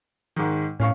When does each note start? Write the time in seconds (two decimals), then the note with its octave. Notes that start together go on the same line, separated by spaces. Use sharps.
0.36 G#2 D#3
0.80 A2 C#4 F5 C#6